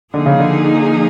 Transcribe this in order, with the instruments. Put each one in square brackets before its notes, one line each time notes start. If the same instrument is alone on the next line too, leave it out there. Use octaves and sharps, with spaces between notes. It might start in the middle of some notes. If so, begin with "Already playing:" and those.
[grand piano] D3 [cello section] F3 A#3 D#4 G#4
[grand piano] C#3
D3